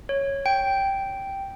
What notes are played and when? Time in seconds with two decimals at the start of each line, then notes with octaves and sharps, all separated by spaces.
0.09 C#5
0.46 G5